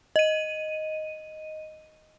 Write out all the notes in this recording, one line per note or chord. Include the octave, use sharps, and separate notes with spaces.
D#5 D#7